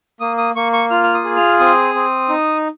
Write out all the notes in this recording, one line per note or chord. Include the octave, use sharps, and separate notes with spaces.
A#3 D#6
D#6
A#3 C#6
C#6
F4 F6
F6
D#6
G#4
F6
C4 D#6
C4
D#4